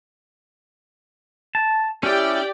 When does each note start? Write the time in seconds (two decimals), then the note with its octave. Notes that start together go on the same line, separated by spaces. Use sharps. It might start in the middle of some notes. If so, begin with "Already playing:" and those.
1.55 A5
2.03 C#4 E4 G4 D5 G5